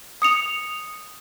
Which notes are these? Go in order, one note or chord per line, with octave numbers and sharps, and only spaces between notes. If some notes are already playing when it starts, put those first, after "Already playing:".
D#6 C#7 F7